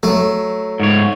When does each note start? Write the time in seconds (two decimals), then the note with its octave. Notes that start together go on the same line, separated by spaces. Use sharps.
0.03 F#3 A3
0.80 G#2 C#5